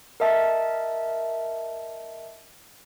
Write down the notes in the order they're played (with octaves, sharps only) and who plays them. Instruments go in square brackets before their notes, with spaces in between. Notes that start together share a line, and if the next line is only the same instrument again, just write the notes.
[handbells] A#4 D#5 E5 A5